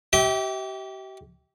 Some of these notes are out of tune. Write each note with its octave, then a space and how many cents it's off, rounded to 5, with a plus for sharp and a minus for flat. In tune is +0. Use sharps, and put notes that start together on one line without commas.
G4 -35 E5 -35 G5 +0